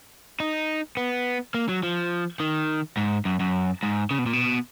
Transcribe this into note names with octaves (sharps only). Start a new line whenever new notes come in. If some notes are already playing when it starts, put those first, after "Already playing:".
D#4
B3
A#3
F#3
F3
D#3
G#2
F#2
F#2
G#2
C#3
B2
A#2
B2